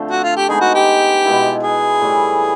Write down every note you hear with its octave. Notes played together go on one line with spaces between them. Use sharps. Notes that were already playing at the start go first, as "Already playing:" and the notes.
Already playing: D3 F3 A3 C4
F#4
F4
G4
G#3 B3 D#4 G#4
F#4
G4
B2 G#3 B3 E4
G#4
A2 E3 G3